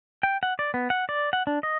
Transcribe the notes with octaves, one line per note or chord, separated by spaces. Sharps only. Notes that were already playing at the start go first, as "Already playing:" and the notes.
G5
F#5
D5
B3
F#5
D5
F#5
D4
D#5